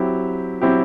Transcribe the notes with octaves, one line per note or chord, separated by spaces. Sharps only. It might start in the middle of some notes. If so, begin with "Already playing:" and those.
Already playing: F#3 C4 E4 G4
F#3 C4 E4 G4